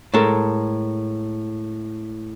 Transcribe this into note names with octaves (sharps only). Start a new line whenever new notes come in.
A2 G#3 A4 A#4